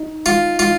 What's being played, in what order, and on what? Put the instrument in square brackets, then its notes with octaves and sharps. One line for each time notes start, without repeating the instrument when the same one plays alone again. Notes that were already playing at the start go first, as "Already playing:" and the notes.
Already playing: [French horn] D#4
[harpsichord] F4
F4